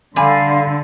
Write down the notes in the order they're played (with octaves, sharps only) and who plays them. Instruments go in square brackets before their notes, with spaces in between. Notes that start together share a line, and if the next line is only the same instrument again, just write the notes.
[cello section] D3 [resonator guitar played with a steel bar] G3 G#5 [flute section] A4 F5 C6